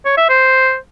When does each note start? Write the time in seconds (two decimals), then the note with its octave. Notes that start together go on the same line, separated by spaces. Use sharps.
0.06 C#5
0.18 E5
0.29 C5